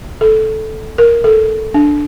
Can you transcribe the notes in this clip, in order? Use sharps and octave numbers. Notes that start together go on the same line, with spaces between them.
A4
A#4
A4
D4